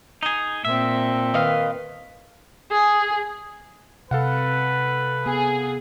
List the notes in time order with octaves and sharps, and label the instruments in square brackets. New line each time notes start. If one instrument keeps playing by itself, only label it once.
[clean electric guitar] D#4 G#4
[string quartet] A#2 C4 [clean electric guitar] E5
[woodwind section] D#3 B4 [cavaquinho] D#5 F5
[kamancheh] G#4
[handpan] C3 [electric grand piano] A4 F5 F#5 [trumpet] B4
[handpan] B3 [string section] G#4